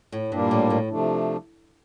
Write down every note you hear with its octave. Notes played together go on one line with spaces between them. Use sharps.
A2
G2 A#2 G3 A#3 D4
A2
A2
C3 F3 A3 D4